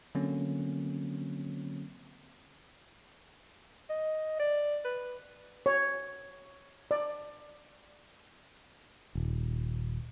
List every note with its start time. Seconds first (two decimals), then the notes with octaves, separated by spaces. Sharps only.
0.15 D3 F#3 A#3 C4 C#4
3.90 D#5
4.40 D5
4.85 B4
5.66 C#5
6.91 D5
9.15 D#1